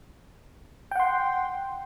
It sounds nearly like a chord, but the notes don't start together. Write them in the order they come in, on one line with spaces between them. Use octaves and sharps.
G5 F#5 C6